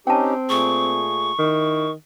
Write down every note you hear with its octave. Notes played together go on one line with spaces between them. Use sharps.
C4 C#4 D#4 G4 G5 A5
A#2 A3 G#4 C#6
D#3 E4